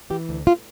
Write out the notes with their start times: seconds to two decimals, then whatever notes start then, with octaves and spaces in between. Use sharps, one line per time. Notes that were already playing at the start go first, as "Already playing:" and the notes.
0.10 E3 G4
0.29 D2
0.47 F4